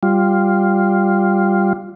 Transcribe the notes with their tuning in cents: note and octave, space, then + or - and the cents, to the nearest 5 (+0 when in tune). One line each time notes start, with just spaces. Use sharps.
G3 +0 F4 +0